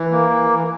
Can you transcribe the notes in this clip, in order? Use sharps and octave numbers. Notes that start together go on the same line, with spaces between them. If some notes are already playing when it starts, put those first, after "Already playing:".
Already playing: E3
A#3
E3
E3